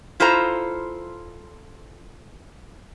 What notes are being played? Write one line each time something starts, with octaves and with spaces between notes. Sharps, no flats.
E4 F4 A4 C5 A#5